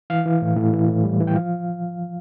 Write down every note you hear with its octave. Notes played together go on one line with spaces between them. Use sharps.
E3 F5
E3
A2
A2
E3
A2
G3
E3
G5
F3 F5